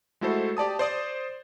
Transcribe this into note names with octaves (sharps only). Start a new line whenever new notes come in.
G#3 A3 E4 F#4 A4 C5
G4 D5 A5 D#6
C5 D5 D#6